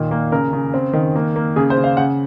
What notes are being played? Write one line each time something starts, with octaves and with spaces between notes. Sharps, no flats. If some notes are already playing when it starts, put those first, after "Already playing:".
Already playing: A#2 D#3
A#3
C#3 A#4
C#3
C4
D#3
A#3
A#3
C#3 G#4
C5
C#3
F5
C#3 F#5